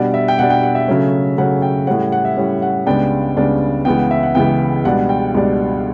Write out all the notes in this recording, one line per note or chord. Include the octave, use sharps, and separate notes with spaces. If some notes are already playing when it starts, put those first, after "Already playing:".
Already playing: B2 G3 D4 F#5
E5
G5
B2 G3 D4 F#5
G5
F#5
E5
C#3 F#3 A3 C#4
C#3 F#3 A3 C#4 F#5
G5
A2 G3 C#4 F#5
F#5
E5
A2 G3 C#4
F#5
C#2 C#3 G3 B3 D4 G5
C#2 C#3 G3 B3 D4
C#2 C#3 E3 B3 G5
F#5
E5
F#5
C#2 C#3 E3 B3 G5
C#2 B2 G3 D4 F#5
G5
C#2 B2 G3 D4